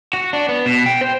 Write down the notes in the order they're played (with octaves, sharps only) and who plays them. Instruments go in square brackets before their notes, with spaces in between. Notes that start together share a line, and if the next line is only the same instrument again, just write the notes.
[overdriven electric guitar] F#4
D4
B3
B2
G5
C5